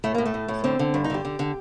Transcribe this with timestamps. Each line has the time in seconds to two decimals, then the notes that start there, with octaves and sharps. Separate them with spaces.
0.04 A2 A3
0.14 A2 A#3
0.26 A3
0.34 A2
0.48 A2
0.64 D3 C4
0.79 D3
0.94 G2 D4
1.04 D#4
1.10 D3 G4
1.25 D3
1.39 D3